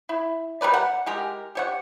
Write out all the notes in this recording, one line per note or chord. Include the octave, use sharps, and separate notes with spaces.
E4
G3 A#4 B4 D5
F#5
G#3 G4 A#4
G4 C#5 F#5